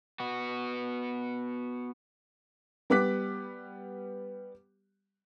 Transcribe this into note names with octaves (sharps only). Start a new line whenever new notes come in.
B3 F#4
G3 B3 G4 D6 F#6 B6